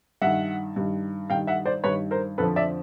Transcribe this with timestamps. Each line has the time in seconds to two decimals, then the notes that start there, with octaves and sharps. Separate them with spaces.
0.22 G2 D#3 E5 F#5
0.76 G2 D#3
1.30 G2 D#3 F5 G5
1.47 E5 F#5
1.65 C5 D5
1.84 G2 D#3 B4 C#5
2.11 A#4 C5
2.38 F2 D3 F3 A4 B4
2.56 D5 E5